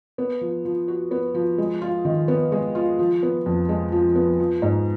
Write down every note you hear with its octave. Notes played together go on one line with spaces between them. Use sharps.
B3
F3
F3
F#4
B3
F3
G#3
F4
D#3
B3
G#3
F4
F3
B3
F2
G#3
F3
B3
F3
G#2